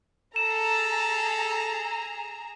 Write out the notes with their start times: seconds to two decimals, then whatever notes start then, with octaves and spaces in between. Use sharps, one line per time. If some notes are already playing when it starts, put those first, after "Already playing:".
0.36 G#4 A4 A#5 E7